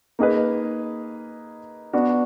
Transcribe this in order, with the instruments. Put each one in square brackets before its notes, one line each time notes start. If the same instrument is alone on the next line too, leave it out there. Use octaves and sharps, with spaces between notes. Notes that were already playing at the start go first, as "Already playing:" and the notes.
[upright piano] A#3 D#4 G#4 B4
B3 D4 F#4